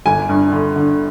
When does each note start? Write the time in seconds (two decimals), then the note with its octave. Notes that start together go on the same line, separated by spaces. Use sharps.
0.06 G1 G#5
0.29 G2
0.52 D3
0.76 D3